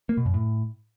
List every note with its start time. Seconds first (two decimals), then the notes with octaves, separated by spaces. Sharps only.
0.09 A#3
0.17 B2
0.26 F#2
0.34 A2